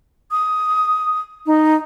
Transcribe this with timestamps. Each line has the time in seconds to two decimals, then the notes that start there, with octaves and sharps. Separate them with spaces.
0.31 D#6
1.46 D#4